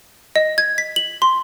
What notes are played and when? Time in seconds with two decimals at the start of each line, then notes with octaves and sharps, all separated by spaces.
0.36 D#5
0.58 G#6
0.78 B6
0.96 F#7
1.22 C6